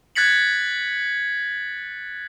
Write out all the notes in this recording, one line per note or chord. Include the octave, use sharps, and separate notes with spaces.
F#6 G#6 A6 B6 C#7 F#7